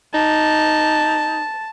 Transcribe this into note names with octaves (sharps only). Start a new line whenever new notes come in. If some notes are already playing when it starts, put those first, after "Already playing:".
D#4 A5